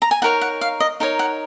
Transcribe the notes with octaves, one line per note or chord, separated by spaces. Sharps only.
A#5
G#5
D#4 A#4 C#5 F#5
F#5
F5
D#5
D#4 A#4 C#5
F#5